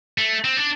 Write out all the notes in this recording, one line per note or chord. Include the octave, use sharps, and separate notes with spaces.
A3
C4
D4